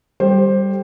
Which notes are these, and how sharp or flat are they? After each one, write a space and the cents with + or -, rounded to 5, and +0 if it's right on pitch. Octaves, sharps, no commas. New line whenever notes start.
G3 +0 A4 +0 C5 +15